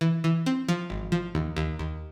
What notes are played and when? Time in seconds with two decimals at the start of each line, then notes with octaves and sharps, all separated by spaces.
0.01 E3
0.24 E3
0.46 C4
0.69 F3
0.90 G#1
1.12 F3
1.35 D#2
1.57 D#2
1.79 D#2